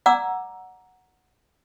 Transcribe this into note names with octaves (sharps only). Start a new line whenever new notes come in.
D5 F#5 A#5 D6 E6